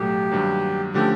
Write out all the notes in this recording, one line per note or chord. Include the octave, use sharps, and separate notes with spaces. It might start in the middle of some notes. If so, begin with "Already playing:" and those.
Already playing: B1 A2 F#3 A3 G4
G2 D#3 F#3 A#3
D3 F3 A3 C#4 G4